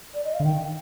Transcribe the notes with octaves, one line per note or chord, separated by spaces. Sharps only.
D5
D#5
F5
D3
D#3 G5